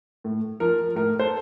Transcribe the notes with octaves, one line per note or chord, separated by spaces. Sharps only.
A2
F3 A#4
A2 A#4
A4 C5